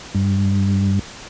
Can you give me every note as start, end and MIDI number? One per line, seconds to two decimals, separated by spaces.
0.15 0.99 43